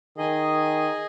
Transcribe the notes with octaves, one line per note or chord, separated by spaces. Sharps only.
D#3 G#4 D#5 G#5